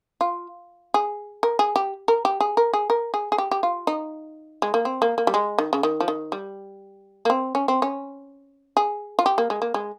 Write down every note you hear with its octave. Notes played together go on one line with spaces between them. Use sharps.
F4
G#4
A#4
G#4
G4
A#4
G4
G#4
A#4
G#4
A#4
G#4
G#4
G4
G4
F4
D#4
G#3
A#3
C4
A#3
A#3
G3
G#3
D#3
C#3
D#3
F3
D#3
G3
A#3
C4
C#4
C4
C#4
G#4
F4
G4
A#3
G#3
A#3
G#3